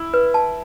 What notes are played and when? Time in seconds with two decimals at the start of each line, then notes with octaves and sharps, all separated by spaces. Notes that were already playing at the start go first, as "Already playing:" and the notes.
Already playing: E4
0.14 B4
0.34 A5